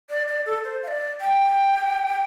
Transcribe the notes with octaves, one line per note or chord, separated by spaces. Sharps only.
D5
D5
A4
C5
F5
D5
G5